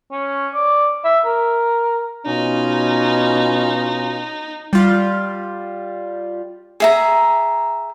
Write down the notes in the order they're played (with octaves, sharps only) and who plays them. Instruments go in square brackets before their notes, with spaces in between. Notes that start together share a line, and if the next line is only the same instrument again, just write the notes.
[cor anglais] C#4
D5
E5
A#4
[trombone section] B2 C#4 F4 [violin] D#4
[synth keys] G3 F4
[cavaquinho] G#4 E5 A#5